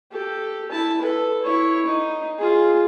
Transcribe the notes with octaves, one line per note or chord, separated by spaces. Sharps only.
G4 A4
E4 A5
A4 B4
E4 C#5
D#4
F4 G#4